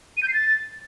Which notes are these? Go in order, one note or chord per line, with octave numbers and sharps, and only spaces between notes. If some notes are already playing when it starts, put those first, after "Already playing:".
D#7
G6
C7
A6